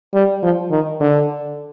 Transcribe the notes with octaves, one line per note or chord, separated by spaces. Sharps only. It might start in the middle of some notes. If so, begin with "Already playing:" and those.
G3
F3
D#3
D3